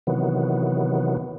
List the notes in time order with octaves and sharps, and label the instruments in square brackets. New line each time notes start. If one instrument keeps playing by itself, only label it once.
[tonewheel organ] C3 D#3 E3 F#3 B3